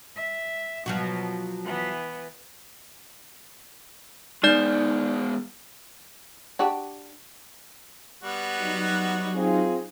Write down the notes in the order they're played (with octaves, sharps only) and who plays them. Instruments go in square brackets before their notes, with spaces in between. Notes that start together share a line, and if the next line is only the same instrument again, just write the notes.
[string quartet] E5
[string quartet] B2 [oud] F3 F#3 F#4
[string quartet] E3 B3
[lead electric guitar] G#3 B3 [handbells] D#4 D5 G6
[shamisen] D4 F#4 G4
[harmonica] G3 B3 F#4
[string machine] F#3 D#4
[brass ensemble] C4 F4 G#4